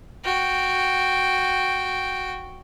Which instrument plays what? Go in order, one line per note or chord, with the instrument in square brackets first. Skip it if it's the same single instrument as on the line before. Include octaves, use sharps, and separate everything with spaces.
[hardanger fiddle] F#4 G5